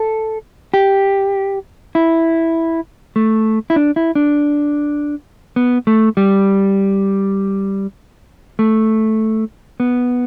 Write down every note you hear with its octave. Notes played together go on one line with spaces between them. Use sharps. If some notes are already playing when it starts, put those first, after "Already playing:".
Already playing: A4
G4
E4
A3
E4
D4
E4
D4
B3
A3
G3
A3
B3